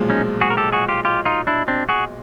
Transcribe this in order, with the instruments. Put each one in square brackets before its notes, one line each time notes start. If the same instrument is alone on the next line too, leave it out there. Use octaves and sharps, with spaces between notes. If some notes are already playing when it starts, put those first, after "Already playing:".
Already playing: [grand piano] B1 A#2 F3 G#3
[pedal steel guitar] C#4 D#4
F#4 G#4
A#4
G4 A4
F#4 G#4
F4 G4
F4 G4
D#4 F4
D4 E4
C4 D4
F#4 G#4